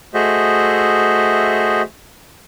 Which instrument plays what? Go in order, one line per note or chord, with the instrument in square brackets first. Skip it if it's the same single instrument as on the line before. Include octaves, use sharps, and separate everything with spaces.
[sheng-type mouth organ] A3 F#4 G#4 C5 D#5 E5